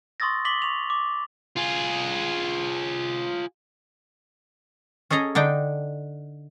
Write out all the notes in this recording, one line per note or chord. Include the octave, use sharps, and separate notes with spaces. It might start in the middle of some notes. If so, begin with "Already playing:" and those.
C6 C#6 D#6 E6 A6 A#6
D6 B6 F#7 G7
C#6 F7
D6
F4 G#4
C#4 G#4 A4 D#5 A#5
D3 D4 D#4 G5